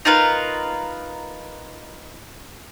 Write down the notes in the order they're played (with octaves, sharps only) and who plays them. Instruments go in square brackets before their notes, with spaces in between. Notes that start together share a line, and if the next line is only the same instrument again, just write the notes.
[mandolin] D#4 F4 A#4 B4